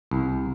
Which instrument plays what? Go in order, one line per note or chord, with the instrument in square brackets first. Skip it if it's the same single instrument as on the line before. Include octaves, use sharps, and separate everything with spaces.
[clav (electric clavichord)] C2